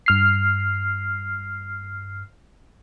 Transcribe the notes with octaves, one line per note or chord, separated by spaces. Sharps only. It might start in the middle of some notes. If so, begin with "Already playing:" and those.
G2 F6 C7